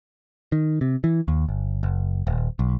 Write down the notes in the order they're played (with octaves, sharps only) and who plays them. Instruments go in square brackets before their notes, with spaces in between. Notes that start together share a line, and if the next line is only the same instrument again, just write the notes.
[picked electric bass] D#3
C3
E3
D#2
G1
F#1
D#1
B1